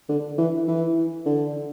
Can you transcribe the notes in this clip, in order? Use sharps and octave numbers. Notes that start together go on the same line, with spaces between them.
D3
E3
E3
D3